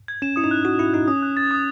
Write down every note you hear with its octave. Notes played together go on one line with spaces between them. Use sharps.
G#6
C#4 E7
E4 D#6
D#4
F#6
F#4 F#6
E4 E7
D#4 F#6
C#4 D#6
F#6
A6
D#6